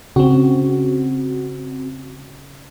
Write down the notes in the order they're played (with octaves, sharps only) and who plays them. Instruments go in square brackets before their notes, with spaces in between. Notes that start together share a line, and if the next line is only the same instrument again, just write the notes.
[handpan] C#3 [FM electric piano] C4 F#4